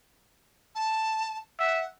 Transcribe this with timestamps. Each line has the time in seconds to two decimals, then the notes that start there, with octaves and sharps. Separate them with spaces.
0.75 A5
1.60 E5 F#5